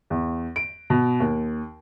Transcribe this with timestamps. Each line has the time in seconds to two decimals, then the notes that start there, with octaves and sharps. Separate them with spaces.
0.10 E2
0.56 D7
0.90 B2
1.20 D#2